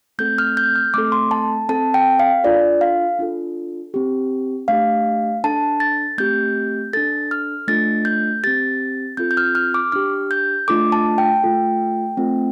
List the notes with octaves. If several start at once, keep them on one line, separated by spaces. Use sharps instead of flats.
A3 C4 A4 G6
F6
G6
F6
A3 C4 A4 D6
C6
A5
C4 A4 A5
G5
F5
D4 F4 A4 D5
F5
D4 F4 A4
C4 G4
A3 D4 G4 F5
D4 A4 A5
A6
A3 C4 G4 G6
D4 A4 A6
F6
A3 D4 F4 A4 A6
G6
C4 G4 A6
C4 F4 A4 G6
G6
F6
F6
D6
D4 G4 F6
G6
A3 D4 F4 A4 D6
A5
G5
A3 F4 A4
A3 C4 F4 A4